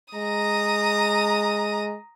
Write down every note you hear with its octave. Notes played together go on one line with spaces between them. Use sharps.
G#3 A#5 D#6